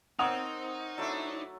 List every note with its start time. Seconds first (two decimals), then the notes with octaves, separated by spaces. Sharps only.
0.19 C4 D#4 A#4 C#5 E5 F#5 D#6 F7
0.98 F#3 A3 D4 E4